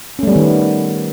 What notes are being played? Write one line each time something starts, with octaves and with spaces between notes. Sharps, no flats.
D#3 G3 A3 B3 C#4